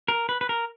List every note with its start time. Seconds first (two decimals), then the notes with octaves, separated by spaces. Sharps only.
0.08 A#4
0.29 B4
0.41 B4
0.49 A#4